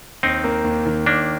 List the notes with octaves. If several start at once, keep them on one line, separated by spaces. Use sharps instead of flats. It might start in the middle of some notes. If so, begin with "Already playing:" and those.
D#2 C4 D#4
A#3
D#2
D#3
D#2 A#3 D4